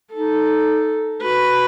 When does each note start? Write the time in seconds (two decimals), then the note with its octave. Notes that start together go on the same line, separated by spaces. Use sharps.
0.14 D#4 A4
1.22 F#4 B4